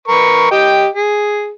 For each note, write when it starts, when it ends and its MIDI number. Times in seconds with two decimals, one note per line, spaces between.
0.08 0.48 70
0.08 0.48 71
0.08 0.48 85
0.51 0.87 67
0.51 0.87 75
0.51 0.87 79
0.94 1.51 68